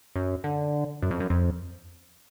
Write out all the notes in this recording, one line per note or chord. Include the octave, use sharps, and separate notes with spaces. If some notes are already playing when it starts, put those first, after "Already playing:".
F#2
D3
F#2
F2
F#2
F2